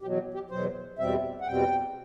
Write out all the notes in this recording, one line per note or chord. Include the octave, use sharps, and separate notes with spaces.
E2 B2 F#3 G4
G4
E2 B2 F#3 C5
E2 B2 G3 C4 E5
F#5
E2 B2 G3 C4 G5